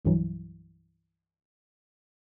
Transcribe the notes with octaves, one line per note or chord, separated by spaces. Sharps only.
C2 G2 D3 E3 F#3